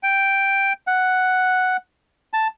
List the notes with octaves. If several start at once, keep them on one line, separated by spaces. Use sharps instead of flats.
G5
F#5
A5